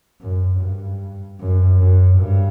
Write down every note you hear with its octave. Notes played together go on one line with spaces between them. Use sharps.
F#2
G2
F#2
F#2
G2